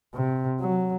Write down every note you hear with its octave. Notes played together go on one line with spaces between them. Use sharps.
C3
F#3